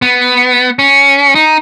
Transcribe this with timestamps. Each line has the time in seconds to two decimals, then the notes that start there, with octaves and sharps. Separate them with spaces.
0.02 B3
0.79 C#4
1.35 D#4